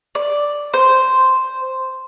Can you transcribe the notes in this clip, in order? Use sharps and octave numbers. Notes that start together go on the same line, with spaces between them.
D5
C5